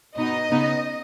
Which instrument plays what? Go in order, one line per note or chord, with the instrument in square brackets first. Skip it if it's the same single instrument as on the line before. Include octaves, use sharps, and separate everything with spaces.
[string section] B2 B3 D#4 D#5
C#3 B3 D#4